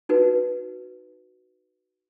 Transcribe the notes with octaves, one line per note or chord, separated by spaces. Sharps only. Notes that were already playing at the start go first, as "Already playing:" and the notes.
D#4 F#4 B4